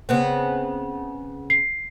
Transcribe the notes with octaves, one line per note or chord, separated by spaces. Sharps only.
C#3 B3 C4
C7